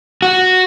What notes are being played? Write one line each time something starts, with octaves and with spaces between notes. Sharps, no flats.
F#4